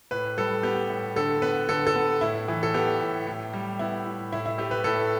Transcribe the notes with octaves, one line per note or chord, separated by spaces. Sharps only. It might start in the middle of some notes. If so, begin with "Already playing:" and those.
A2 B4
G3 A4
B3 G4
A2
D3 A4
B3 B4
D3 A4
A4
B3
A2 E4
E3
A4
B3 G4
A2
A2
G3
B3 E4
A2
A2 E4
E4
A3 G4
B4
A2 A4